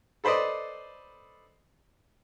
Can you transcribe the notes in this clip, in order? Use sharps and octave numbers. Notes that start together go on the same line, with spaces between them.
A4 B4 C5 D5 D#5